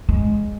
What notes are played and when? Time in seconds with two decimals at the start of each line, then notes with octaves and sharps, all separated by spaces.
0.09 G#3